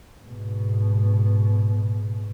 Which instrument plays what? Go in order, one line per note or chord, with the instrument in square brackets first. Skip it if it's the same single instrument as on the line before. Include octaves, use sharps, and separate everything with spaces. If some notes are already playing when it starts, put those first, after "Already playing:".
[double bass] G#2 B2